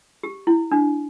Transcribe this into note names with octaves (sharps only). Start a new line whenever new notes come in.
G4
E4
D4